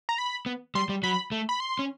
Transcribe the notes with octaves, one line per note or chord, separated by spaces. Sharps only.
A#5
B5
B3
G3 C6
G3
F#3 B5
A3
B5
C6
C#4